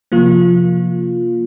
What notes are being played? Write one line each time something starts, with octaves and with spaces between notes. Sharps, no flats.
C3 F3 A#3 F4